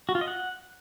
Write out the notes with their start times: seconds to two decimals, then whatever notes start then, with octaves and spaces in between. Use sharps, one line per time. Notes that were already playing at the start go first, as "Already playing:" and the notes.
0.09 F#4
0.15 F4
0.21 D#5
0.28 F#5